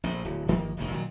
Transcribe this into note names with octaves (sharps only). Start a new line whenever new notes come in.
A#1 A2
D1
G1 D#3 F3 A#3
F1 A#1 F2 D#3
A#2 D#3 F#3